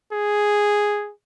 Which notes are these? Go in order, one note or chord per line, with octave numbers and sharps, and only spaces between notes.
G#4